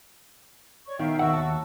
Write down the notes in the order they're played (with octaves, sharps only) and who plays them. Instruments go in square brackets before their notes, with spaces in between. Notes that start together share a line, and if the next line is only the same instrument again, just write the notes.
[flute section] C#5 D5 C#6
[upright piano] B2 D#3 [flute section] E5 F5 G5
[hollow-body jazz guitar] D#2 E5 F#5 [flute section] F#4 C#6 E6
[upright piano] A5